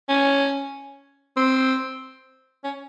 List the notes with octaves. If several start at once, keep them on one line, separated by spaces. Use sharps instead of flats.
C#4
C4
C#4